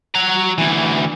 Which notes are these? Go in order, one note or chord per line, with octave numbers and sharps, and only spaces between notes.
F#4 A#5
D2 E3